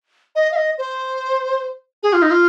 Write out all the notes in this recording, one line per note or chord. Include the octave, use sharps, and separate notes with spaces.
D#5
F5
D#5
C5
G#4
F4
D#4
F4